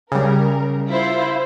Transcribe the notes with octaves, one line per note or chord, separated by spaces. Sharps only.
C#3 G3 A#4
E4 F4 C5